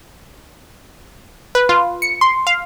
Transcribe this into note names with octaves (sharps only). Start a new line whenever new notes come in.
B4
F4
C#7
C6
F5